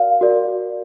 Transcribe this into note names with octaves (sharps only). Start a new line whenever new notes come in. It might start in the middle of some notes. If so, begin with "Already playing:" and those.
Already playing: F#4 A#4 D5 F5
F#4 A#4 D5